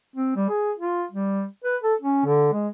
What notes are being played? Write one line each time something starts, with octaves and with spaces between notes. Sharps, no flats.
C4
G3
G#4
F4
G3
B4
A4
C#4
D3
G#3